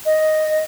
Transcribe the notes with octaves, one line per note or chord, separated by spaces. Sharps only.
D#5